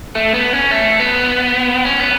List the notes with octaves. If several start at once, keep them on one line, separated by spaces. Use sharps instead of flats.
A3
B3
C#4
A3
B3
C#4
B3